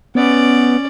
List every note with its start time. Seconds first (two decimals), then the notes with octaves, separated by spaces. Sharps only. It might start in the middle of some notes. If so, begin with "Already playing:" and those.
0.15 B3 C#4 D5